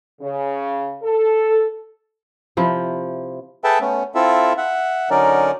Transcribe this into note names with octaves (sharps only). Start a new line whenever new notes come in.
C#3
A4
C3 F3 E4
G#4 A4 B4 E5 G5 A5
A3 B3 C#4
C4 E4 F4 A4 E5
E5 F#5
D3 F#3 C#4 D#4 A#4 D5